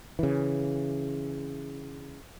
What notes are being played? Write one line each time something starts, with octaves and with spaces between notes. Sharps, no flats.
C#3 E3